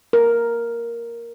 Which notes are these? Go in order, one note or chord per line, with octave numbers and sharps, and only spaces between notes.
A#4